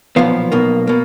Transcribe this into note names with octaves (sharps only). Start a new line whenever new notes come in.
B1 A#2 F3 B3 F5
B1 B2 A#3
B2 A#3